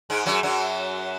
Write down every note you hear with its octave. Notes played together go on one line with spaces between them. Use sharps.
G#2 G#3
F#2 F#3
F#2 F#3